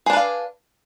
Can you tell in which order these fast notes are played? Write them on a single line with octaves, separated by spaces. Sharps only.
G#4 D4 B4 F5